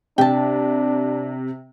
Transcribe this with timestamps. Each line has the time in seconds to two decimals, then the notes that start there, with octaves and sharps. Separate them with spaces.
0.18 C3 D4 G5 A5